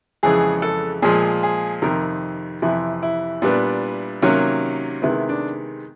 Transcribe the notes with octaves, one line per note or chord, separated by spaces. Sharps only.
F2 C#3 E3 G#3 G#4
A4
A#2 F3 G#3 G#4
G#4
F2 C3 D#3 A#4
F2 C3 E3 E4
E4
A#2 G3 B3 D4
C3 D#3 F#3 A#3 C#4
C3 D#3 G#3 B3 E4
D4